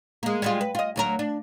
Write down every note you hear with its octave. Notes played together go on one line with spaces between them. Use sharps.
G#3 A#3
G3 G#3 F4
B4
F4 D#5
D2 F#3 A#4
D4